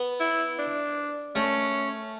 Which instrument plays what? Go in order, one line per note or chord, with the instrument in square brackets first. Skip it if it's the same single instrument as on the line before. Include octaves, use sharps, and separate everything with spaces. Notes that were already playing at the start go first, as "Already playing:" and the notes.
Already playing: [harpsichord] B3
[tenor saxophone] E4
D4
[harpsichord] A3 [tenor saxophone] C#4